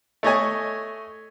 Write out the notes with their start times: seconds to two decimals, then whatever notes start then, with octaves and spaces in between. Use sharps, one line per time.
0.23 A3 C#5 D#5 G#5